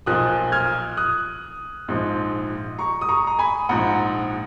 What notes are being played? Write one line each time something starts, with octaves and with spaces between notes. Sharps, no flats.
B1 A#2 F3 D#6 F#6
F6 G#6
D#6 F#6
A#1 G#2 F3
A#5 C#6
D#6
A#5 C#6
A#5
G#5 B5
A#1 G#2 F3 F#5 A#5